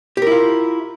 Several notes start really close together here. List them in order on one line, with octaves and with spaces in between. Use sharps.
G4 A#4 E4 F4